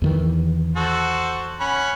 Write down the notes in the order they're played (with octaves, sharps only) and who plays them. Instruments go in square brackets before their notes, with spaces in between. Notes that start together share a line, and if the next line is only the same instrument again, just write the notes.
[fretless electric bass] E2 D#3 E3
[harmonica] F#4 A4 C5
C#4 F#5 B5